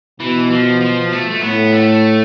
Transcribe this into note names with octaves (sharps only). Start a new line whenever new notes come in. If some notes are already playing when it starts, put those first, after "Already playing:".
B2 E3
F3
F3
A3
A3
A2 B3
A3